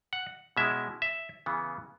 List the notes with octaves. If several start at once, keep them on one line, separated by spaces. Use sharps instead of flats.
F#5
B2 G#3 C#4 E4 E5
E5
C#3 E3 B3